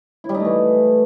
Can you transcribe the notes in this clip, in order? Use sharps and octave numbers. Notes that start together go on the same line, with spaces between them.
E4
G3
D#4
A3
E3